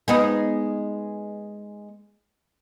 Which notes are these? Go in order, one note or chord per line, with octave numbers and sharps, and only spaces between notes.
G#3 B3 D#4